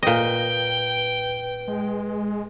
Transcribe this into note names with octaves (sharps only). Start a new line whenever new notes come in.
A#2 B4 D#5 G5
G#3